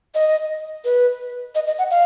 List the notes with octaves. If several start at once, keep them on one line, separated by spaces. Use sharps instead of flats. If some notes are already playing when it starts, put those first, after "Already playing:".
D#5
B4
D#5
D#5
F#5
F5